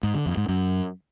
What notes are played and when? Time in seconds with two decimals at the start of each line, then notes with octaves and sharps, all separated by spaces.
0.03 G#2
0.15 D3
0.26 F2
0.37 G#2
0.48 F#2